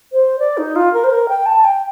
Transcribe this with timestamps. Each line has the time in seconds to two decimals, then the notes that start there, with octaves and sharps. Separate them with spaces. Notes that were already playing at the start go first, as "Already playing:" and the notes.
0.12 C5
0.39 D5
0.58 D#4
0.76 F4
0.94 A#4
1.04 C5
1.11 A#4
1.29 G5
1.46 A5
1.64 G5